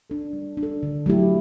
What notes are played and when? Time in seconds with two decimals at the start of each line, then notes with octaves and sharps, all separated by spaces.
0.10 D4 A4
0.33 G3
0.57 D4
0.63 A4
0.83 D3
1.06 F#3 A3 E4 G4